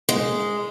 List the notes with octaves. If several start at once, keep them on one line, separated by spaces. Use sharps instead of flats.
G#3